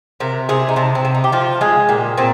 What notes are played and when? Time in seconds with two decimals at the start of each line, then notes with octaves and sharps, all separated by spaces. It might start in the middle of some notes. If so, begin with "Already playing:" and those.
0.20 C3 A#4
0.49 C3 G#4
0.69 D#4
0.76 C3 D4
0.95 C4
1.05 C3
1.15 D#4
1.24 G4
1.32 F3 F4
1.61 G#3 G#4
1.89 A#2 G4
2.18 A#2 C4